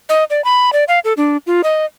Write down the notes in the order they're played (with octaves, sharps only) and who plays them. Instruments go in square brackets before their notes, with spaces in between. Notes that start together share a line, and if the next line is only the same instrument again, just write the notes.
[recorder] D#5
D5
B5
D5
F5
A4
D4
F4
D#5